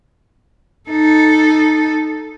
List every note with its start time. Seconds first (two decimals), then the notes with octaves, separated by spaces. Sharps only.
0.89 D#4 A4